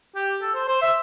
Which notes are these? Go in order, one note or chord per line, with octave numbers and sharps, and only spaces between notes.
G4
A4
C5
C5
E5